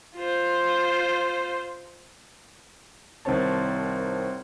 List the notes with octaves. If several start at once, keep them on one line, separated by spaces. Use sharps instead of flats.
F4 C5
C2 D#3 C4 C5 C#5 A5